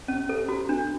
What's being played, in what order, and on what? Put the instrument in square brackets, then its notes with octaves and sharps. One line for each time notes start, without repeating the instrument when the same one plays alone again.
[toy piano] C#4
A4
F#4
D4